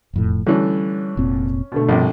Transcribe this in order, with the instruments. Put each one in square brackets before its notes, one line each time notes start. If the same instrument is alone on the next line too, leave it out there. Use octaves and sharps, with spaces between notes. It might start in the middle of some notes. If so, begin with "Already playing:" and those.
[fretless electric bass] E1 F2 A2
[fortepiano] D3 E3 A3 [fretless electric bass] G3 [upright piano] C#4
[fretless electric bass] F1 A#2 C4
[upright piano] B2 D3 A3
[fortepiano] A#1 C3 [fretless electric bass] G2